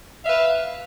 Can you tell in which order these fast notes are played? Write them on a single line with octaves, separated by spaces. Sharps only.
F5 E5 B4